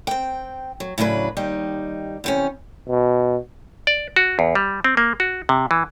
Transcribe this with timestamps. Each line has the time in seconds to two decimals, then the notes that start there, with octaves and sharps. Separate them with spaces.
0.07 C4 G5
0.80 F#3
0.98 A2 C#3 F#3 D4 B4
1.37 D#2 G3 D#4
2.24 E2 C3 C#4
2.89 B2
3.87 D5
4.16 F#4
4.39 E2
4.55 G3
4.84 C4
4.97 A#3
5.20 F#4
5.49 C3
5.71 E3